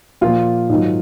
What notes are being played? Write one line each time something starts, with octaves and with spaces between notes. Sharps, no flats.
A#2 F3 F4
G#2 D#3 F#3